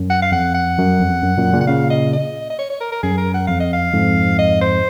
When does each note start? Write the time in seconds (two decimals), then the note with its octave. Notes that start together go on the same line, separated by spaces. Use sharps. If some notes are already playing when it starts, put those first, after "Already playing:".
Already playing: F#2
0.10 F#5
0.22 F5
0.32 F2 F#5
0.54 F#5
0.78 F#2
1.00 F2
1.23 F#2
1.37 F#2 A#2
1.53 A#2 C#3
1.61 F#5
1.67 A#2 C#3 F5
1.90 D#5
2.13 D#5
2.50 D#5
2.59 C#5
2.70 C#5
2.80 A#4
2.92 A#4
3.03 F#2 G#4
3.18 A#4
3.34 F#5
3.47 F2 F5
3.60 D#5
3.73 F5
3.93 F2 G#2
4.39 D#5
4.61 C5